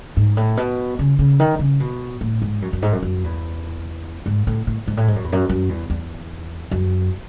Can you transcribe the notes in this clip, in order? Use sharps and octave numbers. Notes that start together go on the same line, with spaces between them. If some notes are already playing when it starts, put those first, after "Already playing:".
G#2
A2
B2
C#3
C#3
D#3
C#3
B2
A2
G#2
F#2
F#2
G#2
F#2
F#2
E2
G#2
A2
A2
G#2
A2
G#2
F#2
E2
F#2
F#2
E2
E2
F#2